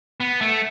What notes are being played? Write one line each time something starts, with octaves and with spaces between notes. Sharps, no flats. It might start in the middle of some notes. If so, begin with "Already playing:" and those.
B3
A3